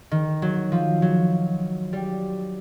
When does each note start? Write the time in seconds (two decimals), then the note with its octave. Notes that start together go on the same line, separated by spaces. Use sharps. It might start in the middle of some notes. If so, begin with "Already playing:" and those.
0.11 D#3
0.42 F#3
0.72 F3
1.02 F#3
1.93 G3